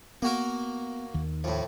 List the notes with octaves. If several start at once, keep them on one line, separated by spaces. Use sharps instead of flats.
A#3 B3 F#4 A#4
D#2 D#3
F2 A2